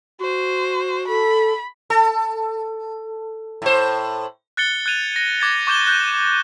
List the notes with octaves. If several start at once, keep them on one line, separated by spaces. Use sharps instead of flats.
F#4 C5
A4 B5
A4
A2 C5
F#6 A6 C#7 G7
F#6 G#6 D#7 F7
A#6
D6 G#6 A6 C#7
C#6 D6 G6 E7 G7
F#6 G6